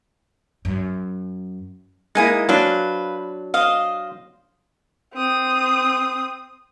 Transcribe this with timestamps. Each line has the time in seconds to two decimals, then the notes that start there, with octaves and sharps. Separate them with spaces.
0.65 F#2
2.15 G#3 A#3 D#4 E4 G#5 D#6
2.49 F#3 D4 B4 C5 F5
3.54 C5 D#5 F5
5.14 C4 D#6